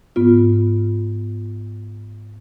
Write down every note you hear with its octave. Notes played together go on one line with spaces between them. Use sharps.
G#2 B3 F4